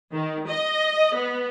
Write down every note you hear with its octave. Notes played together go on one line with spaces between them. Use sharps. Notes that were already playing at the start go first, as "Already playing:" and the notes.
D#3
D#5
B3